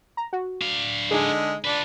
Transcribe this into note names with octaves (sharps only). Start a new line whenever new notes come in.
A#5
F#4
D4 F5
D3 G#3 D#4 G#4
D4 F4 B4